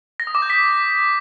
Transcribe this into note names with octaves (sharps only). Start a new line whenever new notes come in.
A#6
D#6
D6
G6
B6